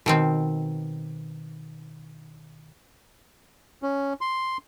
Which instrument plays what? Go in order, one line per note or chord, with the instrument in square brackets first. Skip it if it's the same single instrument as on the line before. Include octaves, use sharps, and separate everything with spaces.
[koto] B2 D#3 C4
[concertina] C#4
C6